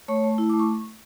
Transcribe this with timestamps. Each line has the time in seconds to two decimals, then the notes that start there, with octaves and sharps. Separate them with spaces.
0.08 A3 C#5 C#6
0.24 A3
0.38 E4
0.49 A3 D6
0.59 C#6